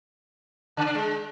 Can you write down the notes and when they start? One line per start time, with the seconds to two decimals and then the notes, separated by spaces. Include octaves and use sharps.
0.77 C#3
0.86 D4
0.95 G#3